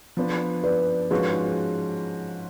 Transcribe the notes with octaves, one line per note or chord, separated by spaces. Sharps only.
F3 B3 D4
B4 D5
G#2 F3 G#3 C#4 F#4 G#4 B4